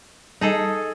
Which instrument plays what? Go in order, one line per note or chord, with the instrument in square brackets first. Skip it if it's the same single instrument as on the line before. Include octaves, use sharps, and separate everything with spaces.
[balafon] G3 A5 [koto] D#4 G#4 A4